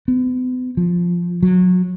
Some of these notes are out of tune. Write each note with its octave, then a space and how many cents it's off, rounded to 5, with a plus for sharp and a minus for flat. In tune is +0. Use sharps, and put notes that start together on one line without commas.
B3 +40
F3 +0
F#3 -25